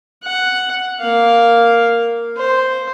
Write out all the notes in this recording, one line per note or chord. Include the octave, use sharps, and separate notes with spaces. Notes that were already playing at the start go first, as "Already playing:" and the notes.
F#5
A#3 F5
C5